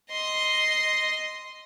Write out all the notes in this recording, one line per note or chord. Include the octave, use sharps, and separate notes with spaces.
D#5 C6